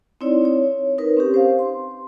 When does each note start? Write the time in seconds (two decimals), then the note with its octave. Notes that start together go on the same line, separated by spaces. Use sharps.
0.21 C4 D#4 E4 C#5 D5
0.45 C#5
0.98 D#4 A#4 B4
1.17 C4 C#4 G4
1.34 C5 F5
1.59 C6